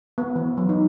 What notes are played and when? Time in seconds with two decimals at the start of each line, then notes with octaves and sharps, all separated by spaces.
0.18 B3
0.36 E3
0.57 F#3
0.69 D#4